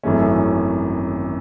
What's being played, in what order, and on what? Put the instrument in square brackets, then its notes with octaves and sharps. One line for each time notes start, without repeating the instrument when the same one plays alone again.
[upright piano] G#1 F#2 E3 A3 C#4